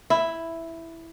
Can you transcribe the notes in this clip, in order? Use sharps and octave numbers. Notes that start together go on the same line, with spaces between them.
E4